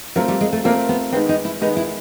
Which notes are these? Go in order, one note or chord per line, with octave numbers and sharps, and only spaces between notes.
F#3 A3 C4 F4 A#4
G3
G#3
A3
A3 A#3 C4 F4 A#4
B3
D#3 G#3 B3 C4
D#4
E4
D#3 G#3 B3 D#4
E4